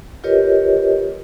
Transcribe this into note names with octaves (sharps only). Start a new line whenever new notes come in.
F4 G4 A#4 B4 C#5 D#5